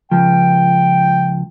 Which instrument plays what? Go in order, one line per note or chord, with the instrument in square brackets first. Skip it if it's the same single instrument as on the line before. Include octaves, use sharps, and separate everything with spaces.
[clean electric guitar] C#2 F3 [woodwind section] G5